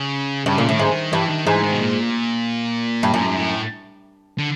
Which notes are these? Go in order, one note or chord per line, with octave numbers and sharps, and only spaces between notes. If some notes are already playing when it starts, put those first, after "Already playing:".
Already playing: C#3
G2 C#3
A#2
A2 D#3
G#2
D3
D#3
G2 E3
D#3
G#2 E3
D#3
B2
A#2
G2
F#2 A2
G#2
A2
D3